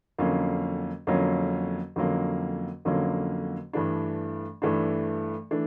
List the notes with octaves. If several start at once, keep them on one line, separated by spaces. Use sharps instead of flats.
F2 D3 F#3 A#3 C#4
F2 D3 F#3 A#3 C#4
F2 D3 F#3 A#3 C#4
F2 D3 F#3 A#3 C#4
G2 E3 A3 D4
G2 E3 A3 D4
E3 A3 D4